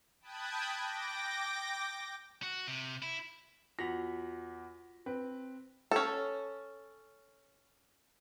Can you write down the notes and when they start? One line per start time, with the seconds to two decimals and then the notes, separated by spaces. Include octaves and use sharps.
0.21 G5 A5 B5 D#6 F#6 G#6
0.76 G5 D6 A#6
2.43 F#4
2.67 C3
3.02 E4
3.79 E2 F4 F#4 A#6 B6
5.06 C4 B4
5.91 C#4 A4